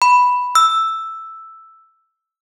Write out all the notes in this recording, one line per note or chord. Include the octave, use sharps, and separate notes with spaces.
B5
E6